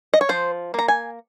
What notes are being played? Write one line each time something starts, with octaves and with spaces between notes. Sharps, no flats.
D#5
C#5
F3 C5
A#3 A#5
G#5